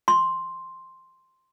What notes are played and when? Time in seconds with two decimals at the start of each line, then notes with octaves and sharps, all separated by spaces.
0.08 C6